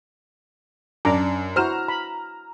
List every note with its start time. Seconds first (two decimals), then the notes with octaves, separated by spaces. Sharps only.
1.05 F#2 D4 A#5 D6
1.56 E4 F#4 C5 A#5 F6 E7
1.88 B5